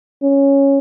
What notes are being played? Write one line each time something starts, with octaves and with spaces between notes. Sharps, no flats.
C#4